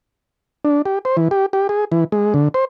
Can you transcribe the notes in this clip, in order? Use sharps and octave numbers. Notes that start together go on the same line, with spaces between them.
D4
G4
C5
E3
G4
G4
G#4
E3
G#3
D3
C5